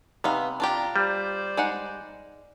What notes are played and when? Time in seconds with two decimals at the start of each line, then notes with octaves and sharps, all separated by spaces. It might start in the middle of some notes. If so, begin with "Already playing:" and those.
0.24 C3 B3 D#4 F5
0.60 D4 F4 G4 A#5
0.96 G3 C5 D5
1.57 G#3 D#4 F#5